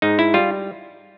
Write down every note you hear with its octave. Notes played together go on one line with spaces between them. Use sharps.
G#2 D#4
E4
G3 F4